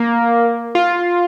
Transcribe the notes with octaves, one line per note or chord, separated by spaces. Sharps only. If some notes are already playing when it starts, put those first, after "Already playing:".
Already playing: A#3
F4